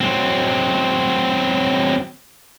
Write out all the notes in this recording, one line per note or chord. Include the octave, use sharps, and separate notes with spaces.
F#3 C4